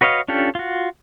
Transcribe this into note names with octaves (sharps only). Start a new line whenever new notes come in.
F#4 B4 C#5 D#5 F5
C#4 D4 F4 G4 A4
F4 F#4